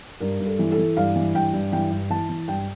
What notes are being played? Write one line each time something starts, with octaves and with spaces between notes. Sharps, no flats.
G2 A#4
G2
A4
E3
A4
E3
G2 F5
E3
G2 G5
G2
E3 G5
G2
E3 A5
E3
G2 G5